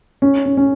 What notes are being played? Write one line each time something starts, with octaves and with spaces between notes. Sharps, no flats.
C#4
C#4
C#4